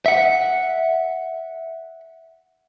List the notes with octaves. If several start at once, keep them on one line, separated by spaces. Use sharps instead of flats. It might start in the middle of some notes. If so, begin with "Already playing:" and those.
E5 F#5